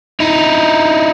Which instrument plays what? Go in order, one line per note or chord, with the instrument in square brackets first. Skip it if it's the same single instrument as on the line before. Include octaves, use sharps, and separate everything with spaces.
[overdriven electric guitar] D#4 E4